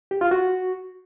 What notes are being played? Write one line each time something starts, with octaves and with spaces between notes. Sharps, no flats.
G4
F4
F#4